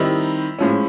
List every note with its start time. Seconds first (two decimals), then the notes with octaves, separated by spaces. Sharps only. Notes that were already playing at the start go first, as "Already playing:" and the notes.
Already playing: D#3 G3 C4 D#4 E4
0.59 A2 F3 G#3 C#4